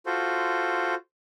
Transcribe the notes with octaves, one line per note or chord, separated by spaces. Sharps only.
F4 F#4 A4 C5